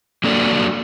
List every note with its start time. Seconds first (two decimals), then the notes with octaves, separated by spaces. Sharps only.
0.24 F#3 A#3 D4 A4 D5